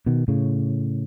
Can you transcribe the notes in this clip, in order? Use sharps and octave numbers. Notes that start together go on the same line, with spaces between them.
B2 D#3
A2 C#3